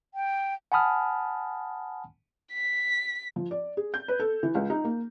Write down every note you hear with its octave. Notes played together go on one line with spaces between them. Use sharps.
G5
F#5 G#5 A5 B5 D#6 F6
B6
F3
D5
G#4
G6
B4
A4
E3
C#2
D#4
A#3